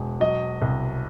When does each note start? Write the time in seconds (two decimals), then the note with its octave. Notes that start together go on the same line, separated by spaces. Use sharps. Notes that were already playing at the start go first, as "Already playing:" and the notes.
Already playing: E1 G#3
0.20 F#3 D#5
0.62 C2